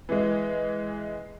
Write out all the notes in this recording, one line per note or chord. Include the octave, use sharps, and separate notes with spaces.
E3 G#3